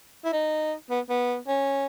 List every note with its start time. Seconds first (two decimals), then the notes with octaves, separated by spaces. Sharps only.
0.24 E4
0.33 D#4
0.90 B3
1.10 B3
1.48 C#4